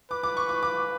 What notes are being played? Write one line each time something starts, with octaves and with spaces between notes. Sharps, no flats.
B4 D6
D6
C#6
D6
D6